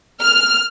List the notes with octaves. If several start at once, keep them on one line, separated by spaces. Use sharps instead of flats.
F6